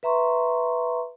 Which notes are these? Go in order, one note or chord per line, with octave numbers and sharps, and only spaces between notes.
B4 E5 A#5 C6 C#6